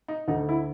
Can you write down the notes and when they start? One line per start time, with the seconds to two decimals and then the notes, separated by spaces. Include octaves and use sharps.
0.08 D#4
0.28 D2 D3 D#4
0.49 E4